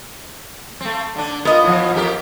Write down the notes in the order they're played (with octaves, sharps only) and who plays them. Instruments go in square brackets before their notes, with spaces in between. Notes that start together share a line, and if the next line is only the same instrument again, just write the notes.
[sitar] A3 C4
D3 D4
[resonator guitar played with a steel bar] B3 D#5 [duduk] F4 [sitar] A#4
[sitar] A2 F3
F2 G4 A#4